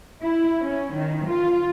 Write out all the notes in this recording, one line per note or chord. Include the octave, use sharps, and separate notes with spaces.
E4
C#4
D#3
F4